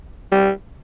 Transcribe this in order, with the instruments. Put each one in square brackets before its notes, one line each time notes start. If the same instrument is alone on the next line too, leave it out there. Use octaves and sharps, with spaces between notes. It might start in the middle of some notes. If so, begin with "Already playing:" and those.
[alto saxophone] G3